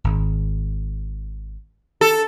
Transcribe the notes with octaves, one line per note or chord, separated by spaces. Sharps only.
G#1
A4